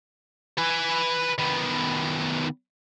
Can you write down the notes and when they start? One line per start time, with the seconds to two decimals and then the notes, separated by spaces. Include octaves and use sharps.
0.58 B4 G#5
1.38 D#3 B3